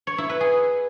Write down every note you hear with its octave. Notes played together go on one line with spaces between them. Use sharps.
C#5
E4
B4
G#4